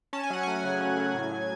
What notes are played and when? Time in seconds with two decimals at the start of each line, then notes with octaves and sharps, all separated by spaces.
0.13 C#4 A5
0.23 G#5
0.30 F#3 F#5
0.43 A3 G#5
0.64 C#3
0.81 C#4
0.98 F#3
1.14 A2
1.31 F#3